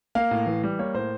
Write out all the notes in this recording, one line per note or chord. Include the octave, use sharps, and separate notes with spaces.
A#3 F5
A2
E3
G3
A#3 C#5
A2 C5